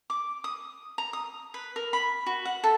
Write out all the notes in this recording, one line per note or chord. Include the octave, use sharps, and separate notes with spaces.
D6
D#6
A#5
D#6
B4
A#4
B5
F#4
F#5
A4